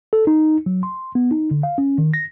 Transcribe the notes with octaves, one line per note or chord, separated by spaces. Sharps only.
A4
D#4
F#3
C6
B3
D#4
D3
F5
C#4
D#3
A#6